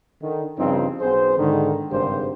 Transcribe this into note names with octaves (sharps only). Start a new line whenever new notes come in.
D3 D#3
G2 C#3 F3 C4 D#4 F4
B1 B3 G#4 C5
G#2 D3 D#3
G#1 G2 C#3 G4 C5